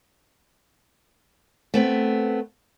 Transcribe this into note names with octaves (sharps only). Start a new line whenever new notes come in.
A3 B3 C4